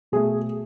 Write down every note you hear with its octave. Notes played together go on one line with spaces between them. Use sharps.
B2 A3 G#4